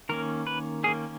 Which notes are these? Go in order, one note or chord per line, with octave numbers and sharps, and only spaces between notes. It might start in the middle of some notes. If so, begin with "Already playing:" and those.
D#3 A#3 C#4 A#4
B4
D#3 A#3 C#4 G#4